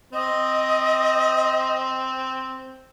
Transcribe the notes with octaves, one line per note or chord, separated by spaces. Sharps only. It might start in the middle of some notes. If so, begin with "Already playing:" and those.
C4 D#5